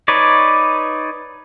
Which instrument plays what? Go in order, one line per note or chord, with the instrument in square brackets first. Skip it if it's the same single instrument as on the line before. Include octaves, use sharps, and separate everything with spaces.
[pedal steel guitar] D#4 B4 C#5 D5